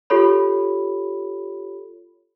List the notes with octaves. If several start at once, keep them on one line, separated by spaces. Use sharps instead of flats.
F4 G4 A4 C#5 B5